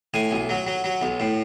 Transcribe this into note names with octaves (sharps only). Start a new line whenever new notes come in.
A2 G#5
B1
F#3
F#3
F#3
B1
A2